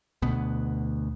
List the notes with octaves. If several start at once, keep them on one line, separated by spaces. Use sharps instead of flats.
D2 B2 B3